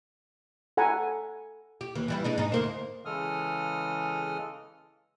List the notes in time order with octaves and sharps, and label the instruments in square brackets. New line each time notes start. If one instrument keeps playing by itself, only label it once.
[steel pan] A4 F#5 G#5 A#5 B5
[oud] G4
D#2 E3
E3 G3 E4
G#3 D4 D#4
G#2 D#4
D2 A#3 C5
[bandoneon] C#3 E3 G#3 A4 D#6 F6